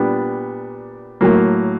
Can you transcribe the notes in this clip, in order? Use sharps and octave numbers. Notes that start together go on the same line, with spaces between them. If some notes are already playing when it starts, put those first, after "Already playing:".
Already playing: A#2 G3 B3 D4
A2 F#3 A#3